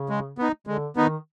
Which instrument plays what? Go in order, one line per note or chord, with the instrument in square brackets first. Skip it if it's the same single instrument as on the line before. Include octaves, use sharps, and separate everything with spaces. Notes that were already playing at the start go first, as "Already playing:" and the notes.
Already playing: [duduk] C#3
[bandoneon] G#3
B3 D#4
[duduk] D3 [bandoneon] G#3
[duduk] D#3 [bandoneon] B3 D#4